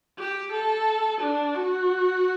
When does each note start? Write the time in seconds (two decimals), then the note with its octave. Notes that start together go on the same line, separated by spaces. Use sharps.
0.18 G4
0.53 A4
1.21 D4
1.55 F#4